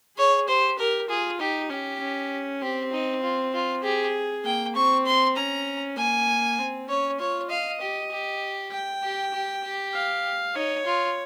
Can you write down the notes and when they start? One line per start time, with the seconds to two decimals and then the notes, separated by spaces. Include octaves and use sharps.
0.17 G#4 C#5
0.48 G4 C5
0.79 G4 A#4
1.09 F4 G#4
1.40 D#4 G4
1.70 C#4 G4
2.00 C#4
2.62 C4 G4
2.92 D#4
3.22 F4
3.53 F4
3.84 G4 G#4
4.45 A#3 G5
4.75 C4 C#6
5.06 C6
5.36 C#4 A#5
5.97 A#3 G#5
6.59 C4
6.89 C#4 C#5
7.19 F4 C#5
7.50 D#5 F5
7.81 G4
8.11 G4
8.72 G5
9.03 G4
9.33 G4
9.64 G4
9.94 F5
10.55 D#4 C#5
10.86 F4